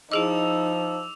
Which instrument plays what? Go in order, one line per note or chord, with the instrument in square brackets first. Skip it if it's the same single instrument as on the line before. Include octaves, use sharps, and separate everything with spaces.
[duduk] F3 [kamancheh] D#4 [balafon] E4 G#4 D#5 [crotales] D6 E6 F7